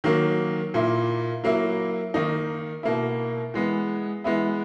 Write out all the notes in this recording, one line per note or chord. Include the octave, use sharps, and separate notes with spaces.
D#3 F#3 A#3
A#2 A#3 E4
F#3 A#3 E4
D#3 A#3 D#4
B2 A#3 E4
E3 G#3 B3
E3 G#3 B3 E4